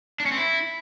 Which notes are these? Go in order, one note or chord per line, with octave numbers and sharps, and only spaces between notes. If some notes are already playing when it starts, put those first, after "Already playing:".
D4
C#4
C4
E4